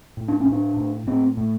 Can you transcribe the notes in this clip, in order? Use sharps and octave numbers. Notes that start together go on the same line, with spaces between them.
A2
D4
C#4
A2
D4
A2
A2 C4
A2